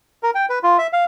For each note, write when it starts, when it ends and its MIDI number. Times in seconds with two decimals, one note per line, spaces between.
0.23 0.31 70
0.35 0.46 79
0.50 0.59 71
0.63 0.77 65
0.78 0.87 76
0.93 1.05 77